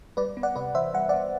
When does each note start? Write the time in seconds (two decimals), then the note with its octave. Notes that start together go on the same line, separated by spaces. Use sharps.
0.17 G3 B4 D5
0.37 B3
0.43 D5 F#5
0.56 C3 B4 D5
0.75 E3 C5 E5
0.94 G3 F#5
1.09 B3 D5 F#5